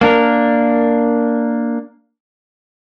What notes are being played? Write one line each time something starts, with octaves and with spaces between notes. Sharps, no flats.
A#3 D4 A#4